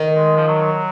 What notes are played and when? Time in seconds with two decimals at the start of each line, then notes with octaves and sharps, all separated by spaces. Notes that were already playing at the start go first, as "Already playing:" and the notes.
Already playing: D#3
0.17 G#3
0.36 F3
0.48 F#3